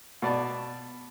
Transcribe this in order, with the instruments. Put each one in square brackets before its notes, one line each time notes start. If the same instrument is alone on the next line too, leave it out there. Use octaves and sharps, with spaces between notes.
[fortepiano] B2 D5 A5